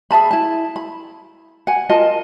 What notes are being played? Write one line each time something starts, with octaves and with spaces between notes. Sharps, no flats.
G#4 E5 A5 B5
E4 A5
B5
F#5 G#5
F4 A#4 D#5 A5